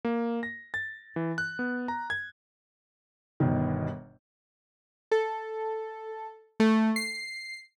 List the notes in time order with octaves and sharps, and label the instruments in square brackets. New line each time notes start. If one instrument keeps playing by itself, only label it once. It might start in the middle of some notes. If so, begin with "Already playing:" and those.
[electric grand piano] A#3
A#6
A6
E3
F#6
B3
A#5
G#6
[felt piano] G1 B2 D#3
[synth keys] A4
A3
C7